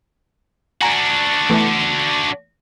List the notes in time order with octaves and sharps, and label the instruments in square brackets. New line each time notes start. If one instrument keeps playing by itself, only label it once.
[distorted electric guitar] D4 F#4 [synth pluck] G#5 A#5
[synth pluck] E3 A3 B3